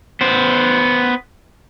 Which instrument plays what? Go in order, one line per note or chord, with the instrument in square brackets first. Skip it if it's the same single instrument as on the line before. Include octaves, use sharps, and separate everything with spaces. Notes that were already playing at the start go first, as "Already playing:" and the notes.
[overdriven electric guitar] B3 C5